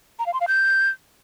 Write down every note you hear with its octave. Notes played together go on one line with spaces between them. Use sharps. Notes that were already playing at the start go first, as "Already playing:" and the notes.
A#5
F5
C6
F5
G6